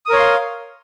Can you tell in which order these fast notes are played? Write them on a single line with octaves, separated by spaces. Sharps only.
D#6 A#4 C#5 C6 F5